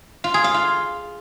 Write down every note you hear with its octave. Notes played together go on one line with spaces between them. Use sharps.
F4
G#4
F5
F4